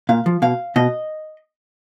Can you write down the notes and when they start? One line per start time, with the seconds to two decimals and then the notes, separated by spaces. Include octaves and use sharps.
0.09 A#2 F5
0.26 F3
0.42 B2 F5
0.76 B2 D#5